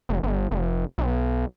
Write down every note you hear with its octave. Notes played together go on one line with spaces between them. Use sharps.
F1
G1
F1
B1